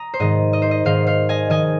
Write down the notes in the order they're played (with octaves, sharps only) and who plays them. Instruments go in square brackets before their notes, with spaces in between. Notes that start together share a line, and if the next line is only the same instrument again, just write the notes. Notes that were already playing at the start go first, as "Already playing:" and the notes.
Already playing: [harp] A#5 D#6
C5
G#2 D#3 D#5
D#5
C5
D#5
G#2 D#3 C5 F5
C5 F5
D#5 G#5
D#3 D#5 G#5